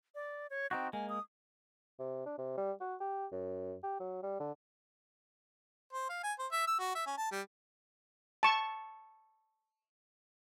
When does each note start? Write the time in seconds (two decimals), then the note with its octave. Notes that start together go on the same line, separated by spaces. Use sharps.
0.15 D5
0.50 C#5
0.71 C4 D#4 F#4 G5
0.93 G#3 A#3 G#5
1.09 D#6
1.99 C3
2.26 D4
2.38 C3
2.57 G3
2.80 F#4
3.00 G4
3.32 F#2
3.83 G4
4.00 F#3
4.23 G3
4.40 D3
5.93 C5
6.10 F5
6.23 G#5
6.39 C5
6.52 E5
6.67 E6
6.79 F#4
6.95 E5
7.07 C#4
7.18 A5
7.32 G3
8.43 A5 C#6